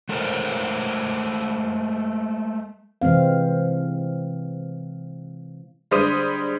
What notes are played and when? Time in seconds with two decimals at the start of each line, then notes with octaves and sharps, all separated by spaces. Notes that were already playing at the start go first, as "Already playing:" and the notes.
0.09 G#3 A3 A4 A#4 C5
3.02 C3 E3 G#3 C4 F5
5.91 D3 G3 G#3 C5 D#6 D#7